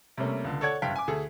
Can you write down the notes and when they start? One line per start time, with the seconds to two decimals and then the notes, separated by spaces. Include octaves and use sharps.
0.17 C3 G3 A3 A#3 C#4
0.44 C#2 D3
0.61 A4 C#5 D5 F#5 G#6
0.82 F#1 G2 F5 G5 B6
0.96 G#5 D6
1.08 D2 G#4 A4